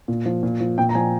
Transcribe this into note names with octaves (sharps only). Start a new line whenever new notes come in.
A#2
F3
A#2
F3
A#2 G5
A#5
F3 G#5